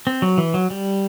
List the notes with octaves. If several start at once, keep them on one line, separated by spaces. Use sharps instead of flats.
C4
F#3
E3
F#3
G3